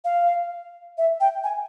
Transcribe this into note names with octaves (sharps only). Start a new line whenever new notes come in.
F5
E5
G5
G#5